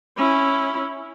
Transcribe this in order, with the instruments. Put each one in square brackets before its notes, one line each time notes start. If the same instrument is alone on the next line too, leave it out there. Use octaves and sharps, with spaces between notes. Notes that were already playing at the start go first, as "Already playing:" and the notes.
[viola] C#4 E4